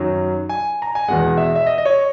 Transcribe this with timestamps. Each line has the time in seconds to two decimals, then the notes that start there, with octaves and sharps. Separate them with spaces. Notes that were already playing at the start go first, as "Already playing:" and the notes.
Already playing: F#2 D#3 F#3
0.49 G#5
0.82 A#5
0.95 G#5
1.08 E2 B2 G#3 F#5
1.37 E5
1.55 E5
1.67 D#5
1.78 D#5
1.85 C#5